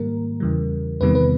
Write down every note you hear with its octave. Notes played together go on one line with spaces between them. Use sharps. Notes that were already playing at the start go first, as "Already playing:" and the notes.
Already playing: G#2 D#3 G3 A#3 A#4
E2 C#3 E3 G3
E2 C3 D#3 G3 B3 B4
B4